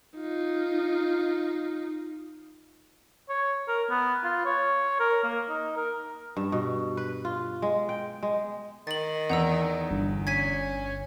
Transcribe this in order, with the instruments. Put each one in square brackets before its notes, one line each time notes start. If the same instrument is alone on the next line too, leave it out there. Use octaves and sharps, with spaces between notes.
[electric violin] D#4 F4
[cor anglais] C#5
A#4
B3
F4
C#5
A#4
A#3
D#4
A#4
[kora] G2
B2
B4
F4
G#3
G5
G#3
[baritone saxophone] D#3 [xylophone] A6 F#7
[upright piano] E2 [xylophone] F#5 A#5 E6
[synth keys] G1
[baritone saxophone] C#4 [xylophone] G#6 B6 D#7